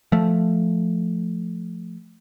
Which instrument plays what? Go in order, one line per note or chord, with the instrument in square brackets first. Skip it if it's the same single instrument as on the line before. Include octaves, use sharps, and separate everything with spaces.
[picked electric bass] F3 A3